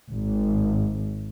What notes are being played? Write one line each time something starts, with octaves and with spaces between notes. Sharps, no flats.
G#1